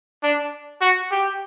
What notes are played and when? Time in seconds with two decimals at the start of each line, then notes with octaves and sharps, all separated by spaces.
0.23 D4
0.81 F#4
1.11 G4